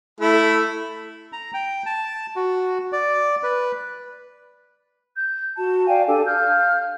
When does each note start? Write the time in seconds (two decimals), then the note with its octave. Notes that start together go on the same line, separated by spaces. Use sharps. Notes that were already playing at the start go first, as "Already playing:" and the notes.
0.21 A3 E4
1.33 A#5
1.54 G5
1.86 A5
2.36 F#4
2.92 D5
3.43 B4
5.15 G6
5.56 F#4 A5
5.87 D5 F5 G5 G#5
6.07 D4 G4 A4 G#5
6.25 F5 F6 G6